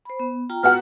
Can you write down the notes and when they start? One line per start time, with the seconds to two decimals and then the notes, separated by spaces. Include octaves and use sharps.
0.05 C5 B5
0.20 B3
0.49 F4 G5 A#5
0.63 B3 F#4 F#5 F6